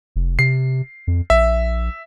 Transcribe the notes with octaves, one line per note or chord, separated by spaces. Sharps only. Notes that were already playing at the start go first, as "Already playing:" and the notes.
F1
C3 C7
F2
A#1 E5